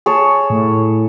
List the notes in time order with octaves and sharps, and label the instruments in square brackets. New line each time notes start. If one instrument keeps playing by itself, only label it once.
[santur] G#4 C#5 A5
[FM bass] A2